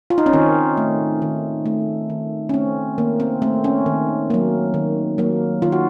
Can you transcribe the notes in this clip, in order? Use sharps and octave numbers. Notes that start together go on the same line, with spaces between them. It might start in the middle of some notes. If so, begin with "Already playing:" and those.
F4
D#4
C#4
D#3 C4
A3
D#3
A3
D#3
C#4
A3 C4
D#3 A#3
C4
A3 C4
C#4
D#3
F#3 A#3
D#3
F#3 A#3
D#3 F4
F#4